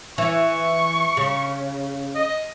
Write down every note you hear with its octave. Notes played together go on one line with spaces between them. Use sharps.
E3 C#6
C#3
D#5